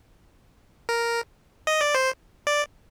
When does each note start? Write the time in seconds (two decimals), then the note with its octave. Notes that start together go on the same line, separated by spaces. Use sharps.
0.89 A#4
1.67 D#5
1.81 D5
1.95 C5
2.47 D5